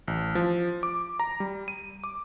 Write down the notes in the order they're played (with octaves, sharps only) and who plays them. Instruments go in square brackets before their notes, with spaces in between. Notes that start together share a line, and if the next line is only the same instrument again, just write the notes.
[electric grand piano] A1
F3
D6
A#5
G3
D#7
D6